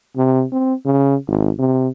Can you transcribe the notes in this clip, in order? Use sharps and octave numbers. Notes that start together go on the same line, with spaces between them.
C3
C4
C#3
G#1
C3